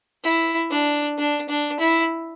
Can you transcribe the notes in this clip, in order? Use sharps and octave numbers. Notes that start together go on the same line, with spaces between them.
E4
D4
D4
D4
E4